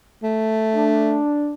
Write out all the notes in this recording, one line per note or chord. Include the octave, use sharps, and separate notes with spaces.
A3
D4